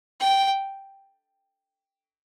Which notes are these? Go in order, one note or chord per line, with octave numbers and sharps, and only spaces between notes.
G5